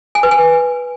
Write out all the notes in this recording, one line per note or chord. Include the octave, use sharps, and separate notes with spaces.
G#5
B4
G#5